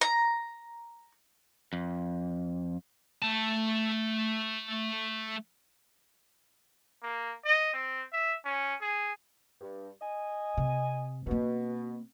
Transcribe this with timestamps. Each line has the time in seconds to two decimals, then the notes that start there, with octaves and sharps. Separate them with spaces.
0.01 A#5
1.73 F2
3.22 A3 A5
7.03 A#3
7.45 D#5
7.74 C4
8.13 E5
8.45 C#4
8.81 G#4
9.61 G2
10.02 D#5 G#5
10.57 C3
11.27 B2 A#3 C4